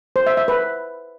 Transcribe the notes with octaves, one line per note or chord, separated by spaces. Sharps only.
C5
E5
E5
B4